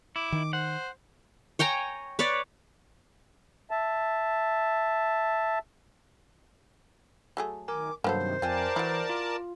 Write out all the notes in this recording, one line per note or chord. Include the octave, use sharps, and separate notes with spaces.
E4 D6
D#3
C5 F#5
C#5 G5 G#5 A#5
B4 C#5 D5
E5 A5
F#3 A3 G#4
D#3 A#4 G#5 D6
G2 C3 D#3 F#3 A#3 B3 A4 C5
F2 C4 F4 A#4 D5 G#5 A5
E3 E4 F#4
F4